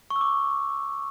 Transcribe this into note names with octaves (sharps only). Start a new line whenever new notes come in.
C#6
E6
D6